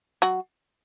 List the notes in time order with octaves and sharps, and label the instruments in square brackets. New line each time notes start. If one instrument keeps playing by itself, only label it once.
[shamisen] F#3 F#4